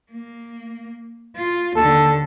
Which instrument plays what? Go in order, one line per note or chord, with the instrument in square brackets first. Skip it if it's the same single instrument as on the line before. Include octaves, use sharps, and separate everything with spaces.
[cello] A#3
F4
[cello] D#2 D3 [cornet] A4